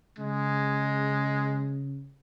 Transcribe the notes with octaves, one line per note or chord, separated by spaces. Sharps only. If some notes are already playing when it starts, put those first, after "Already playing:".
C#3 G#3